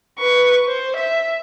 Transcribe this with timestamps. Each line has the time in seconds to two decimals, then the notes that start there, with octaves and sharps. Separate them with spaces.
0.19 B4 C#6
0.67 C5
0.96 E5